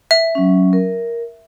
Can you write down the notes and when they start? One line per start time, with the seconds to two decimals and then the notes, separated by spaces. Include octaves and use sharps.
0.11 E5
0.35 F#3 C#4
0.73 A#4